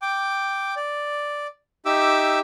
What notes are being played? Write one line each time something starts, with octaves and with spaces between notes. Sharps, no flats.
G5 D6
D5
D#4 G4 E5 D6 E6